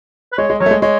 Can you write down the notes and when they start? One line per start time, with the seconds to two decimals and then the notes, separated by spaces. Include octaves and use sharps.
0.33 B4
0.38 G#3 C#5
0.50 G#3
0.60 F#3 C#5
0.66 A3
0.71 G#3
0.82 G#3 C#5